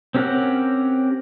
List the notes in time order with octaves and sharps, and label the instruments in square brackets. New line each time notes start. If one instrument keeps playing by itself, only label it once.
[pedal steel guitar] C4 C#4 G4 A#4 F#5